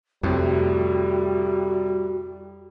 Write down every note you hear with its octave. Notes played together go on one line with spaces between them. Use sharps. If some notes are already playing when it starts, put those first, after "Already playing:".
F2 A2 C3 G3 F#4